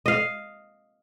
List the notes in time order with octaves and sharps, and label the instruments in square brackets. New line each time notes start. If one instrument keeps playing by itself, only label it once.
[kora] D#5 F5